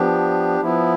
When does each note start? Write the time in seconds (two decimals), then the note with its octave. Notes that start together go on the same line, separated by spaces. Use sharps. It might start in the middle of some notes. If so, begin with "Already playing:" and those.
Already playing: F3 B3 D4 G4
0.61 F3 B3 E4